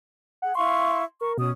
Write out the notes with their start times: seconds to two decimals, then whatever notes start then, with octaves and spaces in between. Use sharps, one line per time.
0.42 G#4 F#5
0.55 E4 F5 C6 C#6
1.21 A#4 C#6
1.38 B2 C#4 D#6